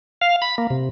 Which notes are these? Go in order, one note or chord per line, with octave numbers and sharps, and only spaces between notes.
F5
B5
A#3
C3